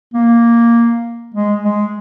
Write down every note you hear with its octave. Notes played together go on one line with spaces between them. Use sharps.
A#3
G#3
G#3